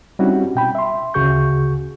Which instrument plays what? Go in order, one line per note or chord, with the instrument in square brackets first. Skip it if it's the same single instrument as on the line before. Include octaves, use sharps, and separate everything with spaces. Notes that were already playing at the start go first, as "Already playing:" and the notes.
[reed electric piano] G3 C4 C#4 D#4 E4 F#4
B2 G5 B5
E5 C6
D2 C#3 F#4 G#4 C#6 G6